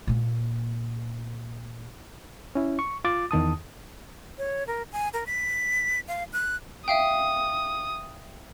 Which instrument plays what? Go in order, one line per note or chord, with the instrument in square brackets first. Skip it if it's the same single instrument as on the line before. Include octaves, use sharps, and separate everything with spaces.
[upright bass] A#2 A#3
[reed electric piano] C#4 E4
C#6
F4 D6 A6
E2 D#3 A5 D#6
[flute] C#5
A#4
G#5
A#4
B6
F5
F#6
[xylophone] E5 F5 G5 [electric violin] D#6